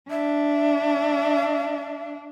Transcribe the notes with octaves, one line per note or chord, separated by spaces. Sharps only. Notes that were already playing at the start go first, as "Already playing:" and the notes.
D4 E5